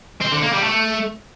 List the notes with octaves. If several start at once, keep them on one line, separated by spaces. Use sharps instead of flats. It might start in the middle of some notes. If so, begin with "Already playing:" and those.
C4
D3
A#3
G3
A3